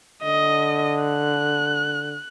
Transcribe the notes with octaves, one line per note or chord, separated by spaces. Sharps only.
D3 D#5
F#6